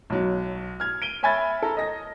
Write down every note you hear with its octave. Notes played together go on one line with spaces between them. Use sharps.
B1 F#3
F6 G#6
D7 D#7 G7
C#5 E5 G#5 B5 G#6 A6
A4 A#5
D#5 A#6